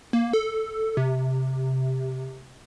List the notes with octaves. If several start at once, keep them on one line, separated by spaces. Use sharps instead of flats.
A#3
A4
C3